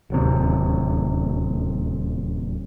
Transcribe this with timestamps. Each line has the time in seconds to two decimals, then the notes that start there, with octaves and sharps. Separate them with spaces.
0.10 D1 D#2 C3